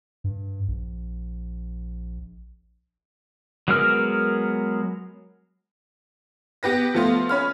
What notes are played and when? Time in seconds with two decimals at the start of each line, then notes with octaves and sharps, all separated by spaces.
0.24 G2
0.68 A#1
3.68 F#3 G#3 B3 A#4 F6
6.63 B3 G4 B4 A#6
6.94 F3 A3 B3 F4
7.29 C#4 B5 F6